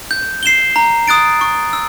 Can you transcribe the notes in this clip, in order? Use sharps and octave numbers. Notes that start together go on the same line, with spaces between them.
G6
C7 E7 G7
A#5
D#6 F#6 A6 D7
C#6
E6